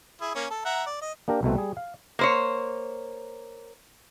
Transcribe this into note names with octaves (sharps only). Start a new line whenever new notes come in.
E4 G#4
A#3 C#4
A4
E5 F#5 A#5
D5
D#5
A#3 D4 G4 A#4
C2 B2 A3 C4
G3 G#4
F5
A#3 C5 C#5